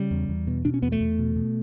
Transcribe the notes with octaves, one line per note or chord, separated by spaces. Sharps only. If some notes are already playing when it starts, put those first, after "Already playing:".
Already playing: C#3 G3
E2
E2
B2
B2 D4
C#4
E2 B3
A3
E2
B2
B2